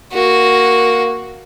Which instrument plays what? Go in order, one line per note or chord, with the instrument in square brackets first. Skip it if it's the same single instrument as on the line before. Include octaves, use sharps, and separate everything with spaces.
[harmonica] A#3 [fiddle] F#4